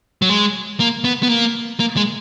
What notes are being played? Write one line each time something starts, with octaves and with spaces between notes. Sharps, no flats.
F#3
G#3
A#3
B3
B3
A#3
A#3
G#3